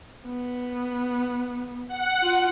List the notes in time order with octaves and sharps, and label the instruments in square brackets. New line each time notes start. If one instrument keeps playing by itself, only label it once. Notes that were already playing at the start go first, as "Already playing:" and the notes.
[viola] B3
[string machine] F#5
[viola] F4